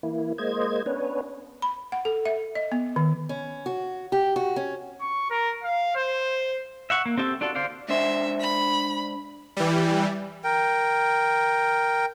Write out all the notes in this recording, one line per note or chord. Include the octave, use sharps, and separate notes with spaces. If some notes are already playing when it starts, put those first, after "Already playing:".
E3 A#3 E4
G#3 A#3 C5 D#5 G#6
B3 C#4 D4 B4 C#5
B5
F#5
A4
E5
D#5
B3
D#3
C#4
F#4
G4
F#4
C#4
C#6
A#4
F5
C5
E5 F#5 C#6
A#3
C4 G4 A4 E5
D4 F4 F#4 A4
D3 C5 D5 F5
G#2 D4 C5 E5
B5
E3 G3
A#4 G5